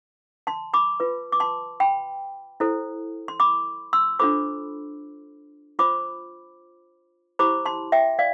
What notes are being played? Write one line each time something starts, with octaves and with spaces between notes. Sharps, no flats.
A5 C6
B5 D6
F4 B4
D6
A5 C6
G5 B5
E4 A4 C5
C6
B5 D6
C6 E6
D4 F4 A4 C5 B5 D6
F4 C5 B5 D6
E4 G4 C5 B5 D6
A5 C6
E5 G5
D5 F5